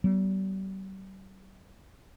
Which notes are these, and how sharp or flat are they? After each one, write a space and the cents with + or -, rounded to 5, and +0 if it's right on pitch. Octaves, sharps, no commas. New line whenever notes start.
G3 -40 B3 -15